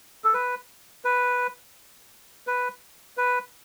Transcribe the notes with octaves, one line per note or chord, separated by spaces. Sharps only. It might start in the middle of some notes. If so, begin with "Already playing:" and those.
A4
B4
B4
B4
B4